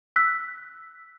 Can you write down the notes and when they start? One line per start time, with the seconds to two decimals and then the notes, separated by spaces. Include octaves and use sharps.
0.16 E6 F#6 B6